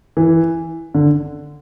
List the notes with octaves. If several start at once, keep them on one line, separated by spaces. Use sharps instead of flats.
E3
D3